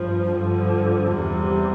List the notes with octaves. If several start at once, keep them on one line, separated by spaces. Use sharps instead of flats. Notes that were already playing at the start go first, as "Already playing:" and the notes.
Already playing: G2 F3
G2 D3 F3
E2 C3 G3